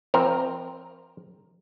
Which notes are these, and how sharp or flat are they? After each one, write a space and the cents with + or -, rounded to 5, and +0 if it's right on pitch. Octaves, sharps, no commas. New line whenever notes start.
F3 -30 C4 +0 A#4 +0